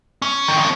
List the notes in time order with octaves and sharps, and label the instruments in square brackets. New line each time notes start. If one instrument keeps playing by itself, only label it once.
[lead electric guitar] C#4
D#3
F3